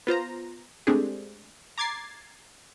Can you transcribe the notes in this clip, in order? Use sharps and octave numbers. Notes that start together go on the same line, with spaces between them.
B3 F4 C5 A#5
G#3 A3 C4 D4 G4 G#4
A#5 D6 G#6 A6 C7